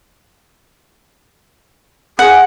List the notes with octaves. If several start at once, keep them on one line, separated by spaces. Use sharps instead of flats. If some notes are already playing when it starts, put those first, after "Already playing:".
G#4 F#5